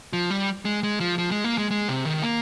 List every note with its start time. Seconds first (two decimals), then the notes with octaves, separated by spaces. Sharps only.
0.13 F3
0.30 G3
0.65 G#3
0.83 G#3
1.00 F3
1.18 F3
1.31 G#3
1.44 A#3
1.58 G#3
1.71 G#3
1.88 C3
2.05 D#3
2.23 A#3